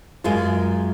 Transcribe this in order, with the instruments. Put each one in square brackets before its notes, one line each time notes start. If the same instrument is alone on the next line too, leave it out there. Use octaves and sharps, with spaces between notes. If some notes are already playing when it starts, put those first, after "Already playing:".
[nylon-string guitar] F#2 G#3 F4